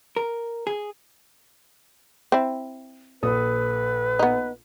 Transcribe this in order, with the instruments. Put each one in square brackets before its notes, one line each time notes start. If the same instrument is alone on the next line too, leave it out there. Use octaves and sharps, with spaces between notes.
[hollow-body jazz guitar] A#4
G#4
[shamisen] C4 E4
[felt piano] A#1 A4 D#6 [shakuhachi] B4
[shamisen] B3 D#4